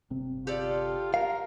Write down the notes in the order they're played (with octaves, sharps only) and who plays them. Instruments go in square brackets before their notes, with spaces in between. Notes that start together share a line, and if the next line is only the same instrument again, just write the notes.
[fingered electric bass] G1 C3 C4
[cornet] F4 [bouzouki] G4 A4 D5
[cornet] A#4 [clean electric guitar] F5